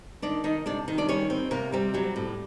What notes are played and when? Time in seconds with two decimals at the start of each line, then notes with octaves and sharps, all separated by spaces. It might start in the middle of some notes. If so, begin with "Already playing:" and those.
0.22 D#3 D4 D5
0.44 D#3 D#4 D#5
0.66 C3 D4 D5
0.88 D#3
0.98 D4 D5
1.08 G3 C#4 C#5
1.30 C4
1.51 C3 A#3 A#4
1.72 G3 C4 G4
1.94 F#3 G3 G4
2.16 A2